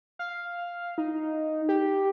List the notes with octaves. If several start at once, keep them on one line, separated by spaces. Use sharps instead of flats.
F5
D#4
G4